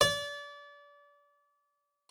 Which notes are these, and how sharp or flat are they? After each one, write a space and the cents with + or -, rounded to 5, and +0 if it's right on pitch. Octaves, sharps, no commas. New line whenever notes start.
D5 -30